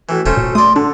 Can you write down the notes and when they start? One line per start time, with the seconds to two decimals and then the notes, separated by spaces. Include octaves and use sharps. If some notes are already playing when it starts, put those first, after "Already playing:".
0.09 A2 E3 F#4
0.26 F1 A3 C#4 C5
0.37 A#2
0.55 A3 D5 C6 D#6
0.76 D3 D4 A5